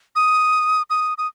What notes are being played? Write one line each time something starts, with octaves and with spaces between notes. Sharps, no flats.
D#6
D#6
D#6